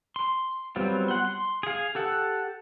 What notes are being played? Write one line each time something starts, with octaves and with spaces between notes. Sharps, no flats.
C6
F#3 G3 B3 C4 F4
F#5 C6
C6
G#4 F5
G4 A4 F#5